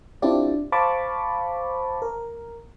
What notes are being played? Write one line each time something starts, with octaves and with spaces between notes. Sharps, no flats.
C4 D4 E4 F4 G4 D5
C5 F5 A5 B5 C#6 D6
A#4